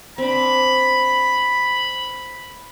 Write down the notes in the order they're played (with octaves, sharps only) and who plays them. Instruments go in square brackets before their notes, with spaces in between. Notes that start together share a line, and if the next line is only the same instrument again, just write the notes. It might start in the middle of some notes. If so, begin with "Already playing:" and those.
[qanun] C4 D4 [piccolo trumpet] B5